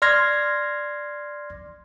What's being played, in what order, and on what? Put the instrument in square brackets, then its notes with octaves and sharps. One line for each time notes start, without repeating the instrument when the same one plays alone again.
[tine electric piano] D5 C6 F6 G#6 A#6